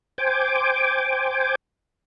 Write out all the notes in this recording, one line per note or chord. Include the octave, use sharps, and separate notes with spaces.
C5 G5 G#5 D6